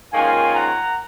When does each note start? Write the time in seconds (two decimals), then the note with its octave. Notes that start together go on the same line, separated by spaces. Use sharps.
0.12 G#2 D#3 A#3 C#4 F4 F5 G#5
0.53 F#5 A#5